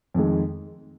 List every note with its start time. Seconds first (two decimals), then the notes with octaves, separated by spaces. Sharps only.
0.14 F2 D#3 G#3